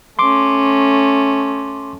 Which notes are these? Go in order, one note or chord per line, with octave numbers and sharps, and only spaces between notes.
A3 C#4 C6 D6